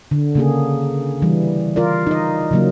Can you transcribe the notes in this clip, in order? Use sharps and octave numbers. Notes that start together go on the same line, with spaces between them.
D3
C#3 A#3 G#4
E3 G3
F4 A#4 D5
D#4 D#5
C#3 F#3 A#3